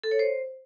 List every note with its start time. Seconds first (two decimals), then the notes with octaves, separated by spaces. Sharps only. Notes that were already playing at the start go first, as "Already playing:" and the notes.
0.03 A4
0.11 C#5
0.19 C5